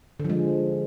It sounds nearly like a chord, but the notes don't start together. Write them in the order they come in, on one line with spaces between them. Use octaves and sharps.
D3 F3 G#3